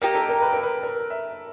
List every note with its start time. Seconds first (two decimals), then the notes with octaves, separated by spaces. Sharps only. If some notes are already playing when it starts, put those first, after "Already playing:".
0.02 A#3 D#4 G4 A#4
0.15 A4
0.29 A#4
0.42 B4
0.53 A#4
0.63 B4
0.83 A#4
1.10 E5